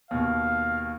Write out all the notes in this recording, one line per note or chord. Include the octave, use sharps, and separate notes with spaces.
D#2 B2 F5